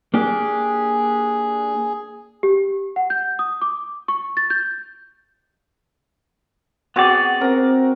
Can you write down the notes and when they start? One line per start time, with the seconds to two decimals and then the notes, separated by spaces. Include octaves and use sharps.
0.14 A#3 D4 G4 G#4
2.43 G4
2.96 F#5
3.10 G6
3.39 D#6
3.62 D6
4.08 C#6
4.37 A6
4.50 G6
6.96 B3 C4 F#4 G#4 D5
7.41 C4 A#4 A#5